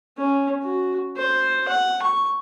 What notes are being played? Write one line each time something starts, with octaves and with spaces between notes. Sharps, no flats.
C#4
F#4
C5
F#5
C#6